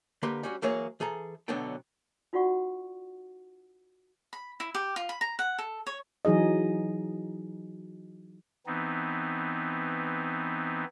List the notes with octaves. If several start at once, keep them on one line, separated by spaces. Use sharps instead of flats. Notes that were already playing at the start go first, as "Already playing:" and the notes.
D3 A#3 G4 B4 C6
G3 C#4 F#4
E3 F#3 A#3 G#4 C#5
E3 G#4 A4 A#5
B1 D3 F#3 B3 D4 G5
D#4 F4 F#4 D5 F#5 C#6
B5
E4
G4
F4
B5
A#5
F#5
A4
C#5
E3 F#3 D#4 G#4 D#5
E3 B3 C4 D#4